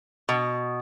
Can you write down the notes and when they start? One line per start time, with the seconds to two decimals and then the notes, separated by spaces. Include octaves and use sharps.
0.29 B2